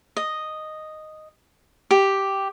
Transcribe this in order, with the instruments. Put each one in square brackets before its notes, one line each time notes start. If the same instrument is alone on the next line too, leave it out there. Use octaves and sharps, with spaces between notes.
[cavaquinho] D#5
G4